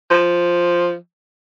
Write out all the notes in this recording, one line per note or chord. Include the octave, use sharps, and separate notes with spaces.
F3